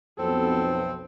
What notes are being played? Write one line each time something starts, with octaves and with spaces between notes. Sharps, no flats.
B1 F2 B3 C4 A4